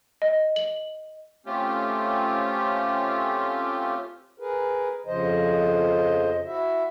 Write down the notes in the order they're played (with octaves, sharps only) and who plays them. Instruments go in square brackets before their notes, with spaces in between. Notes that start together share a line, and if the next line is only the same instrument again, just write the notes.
[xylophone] D#5
F#7
[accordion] A3 C4 C#4 F4 G4
[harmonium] G#4 A#4 B4
F2 C#3 F3 C5 D#5
E4 F#4 E5